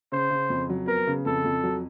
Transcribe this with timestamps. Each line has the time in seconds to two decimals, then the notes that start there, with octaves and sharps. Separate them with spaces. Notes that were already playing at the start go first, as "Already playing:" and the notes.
0.12 C#3 C5
0.31 C#3
0.50 F2
0.69 F#3
0.87 B3 A#4
1.07 C#3
1.26 F2 A4
1.44 F2
1.64 F#3